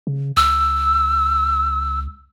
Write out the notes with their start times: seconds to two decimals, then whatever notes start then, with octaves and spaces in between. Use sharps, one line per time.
0.07 C#3
0.37 C#2 E6